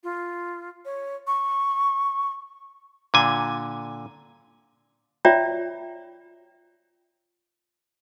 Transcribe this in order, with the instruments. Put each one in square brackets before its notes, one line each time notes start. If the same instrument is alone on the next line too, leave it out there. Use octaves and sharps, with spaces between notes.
[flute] F4
C#5
C#6
[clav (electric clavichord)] A#2 D3 G#5
[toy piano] F4 C#5 D5 E5 G5 A#5